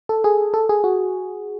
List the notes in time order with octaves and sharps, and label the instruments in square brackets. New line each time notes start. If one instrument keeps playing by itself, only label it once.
[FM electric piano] A4
G#4
A4
G#4
F#4